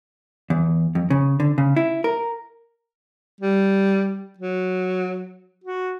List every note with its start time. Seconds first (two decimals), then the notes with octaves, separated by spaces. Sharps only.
0.50 E2
0.95 F2
1.10 C#3
1.40 D3
1.58 C#3
1.76 E4
2.04 A#4
3.41 G3
4.39 F#3
5.64 F#4